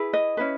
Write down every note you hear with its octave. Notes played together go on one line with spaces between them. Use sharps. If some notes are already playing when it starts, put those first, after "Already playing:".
Already playing: E4 G#4 B4
D#5
C#4 E4 B4